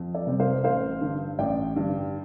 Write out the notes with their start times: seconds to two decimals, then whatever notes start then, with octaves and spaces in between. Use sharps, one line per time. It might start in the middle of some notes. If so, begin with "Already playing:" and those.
Already playing: F2
0.14 A4 D5
0.27 C3 G3 C4
0.40 C5 F5
0.64 A1 C5 F5
1.01 G2 D3
1.38 A1 D5 G5
1.76 G2 D3